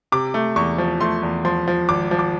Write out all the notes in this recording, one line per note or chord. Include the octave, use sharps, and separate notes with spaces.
C3 D6
A3
E2 C#6
F3
A3 C6
E2
F3 C6
F3
G#1 D6
F3
D6